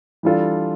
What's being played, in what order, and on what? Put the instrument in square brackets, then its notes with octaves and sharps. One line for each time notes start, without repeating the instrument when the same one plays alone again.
[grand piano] E3 G3 D4 F4 A4